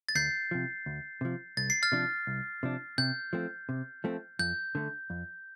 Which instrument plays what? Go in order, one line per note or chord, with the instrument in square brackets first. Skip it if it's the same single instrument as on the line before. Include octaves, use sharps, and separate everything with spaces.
[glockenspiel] A6
[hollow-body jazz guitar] D2 [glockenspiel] G6 C7
[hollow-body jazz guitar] C3 F3
D2
C3 F3
[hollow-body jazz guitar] C2 [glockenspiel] A6
[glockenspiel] C7
F6 A6
[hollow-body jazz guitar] C3 F3 D4
C2
C3 F3 D4
[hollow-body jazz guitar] C3 [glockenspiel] G6
[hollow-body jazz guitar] F3 A3 C4
C3
F3 A3 C4
[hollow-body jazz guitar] F2 [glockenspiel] G6
[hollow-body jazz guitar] D3 A3
F2